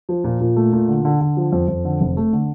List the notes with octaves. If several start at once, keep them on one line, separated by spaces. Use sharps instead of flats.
F3
A#2
A#2
A3
A#2
D3
D3
D3
F3
F2
F2
D3
F1
A3
D3